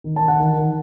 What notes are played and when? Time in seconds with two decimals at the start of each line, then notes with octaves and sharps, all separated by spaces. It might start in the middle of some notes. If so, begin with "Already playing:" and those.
0.04 D#3
0.16 A5
0.22 D#3
0.28 F#5
0.40 D#3
0.57 D#3